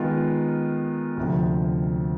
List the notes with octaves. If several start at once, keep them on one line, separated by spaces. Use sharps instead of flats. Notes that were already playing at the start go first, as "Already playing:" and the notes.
Already playing: D#3 G#3 B3 F4
D2 C3 F3